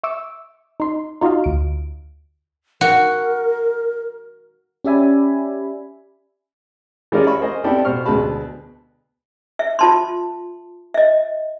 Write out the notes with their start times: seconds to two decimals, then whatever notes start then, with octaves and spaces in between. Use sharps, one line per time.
0.03 E5 C#6 D6 E6
0.80 D#4 C6
1.21 D#4 F4 F#4 D#5 F5
1.44 D2 D7
2.81 F#4 A#4
4.84 C#4 G4 D5 E5 G#5 B5
7.12 E3 G#3 C#4 F4 A#4 D5
7.27 E5 B5 C#6
7.41 A#4 C5 D#5 G#5
7.64 B3 C4 D4 E4 G4 A4
7.85 B2 C5 C#6 F6
8.05 D2 B2 G#3 B4 A5 B5
9.59 E5
9.79 F4 A5 C6
10.94 D#5 E5